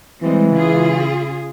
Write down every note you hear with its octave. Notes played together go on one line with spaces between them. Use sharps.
E3 G3 G#3 C4
C#3 F4 G#4